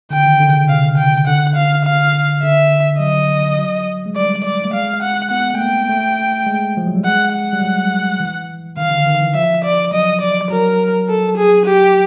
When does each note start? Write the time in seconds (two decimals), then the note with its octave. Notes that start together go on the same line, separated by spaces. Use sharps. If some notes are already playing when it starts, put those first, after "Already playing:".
0.11 D3 G5
0.26 D#3
0.40 D3
0.49 C#3
0.54 D3
0.69 C3 F5
0.98 G5
1.27 D3 F#5
1.55 F5
1.85 F5
2.43 D3 E5
2.99 F#3 D#5
3.57 F#3
4.06 G#3
4.15 G3 D5
4.44 D5
4.65 A3
4.73 G#3 F5
5.02 F#5
5.31 B3 F#5
5.54 A3
5.59 A#3 G5
5.89 A3
6.46 G#3
6.77 F3
6.87 F#3
6.95 G3
7.04 G#3 F#5
7.34 F#5
7.53 G3
7.62 F#3
8.20 E3
8.77 D#3 F5
8.91 D3
9.06 D#3
9.21 E3
9.35 F3 E5
9.65 D5
9.92 F#3 D#5
10.21 D5
10.50 F#3 A#4
11.09 A4
11.37 G#4
11.66 G4